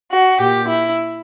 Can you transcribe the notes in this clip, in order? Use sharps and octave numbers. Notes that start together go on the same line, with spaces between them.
F#4
A#2 G4
E4